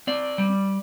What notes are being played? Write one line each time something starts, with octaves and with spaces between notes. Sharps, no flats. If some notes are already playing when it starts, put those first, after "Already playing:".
C4 D5
G3